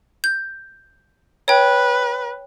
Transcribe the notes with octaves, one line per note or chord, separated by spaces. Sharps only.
G6
B4 C#5 G5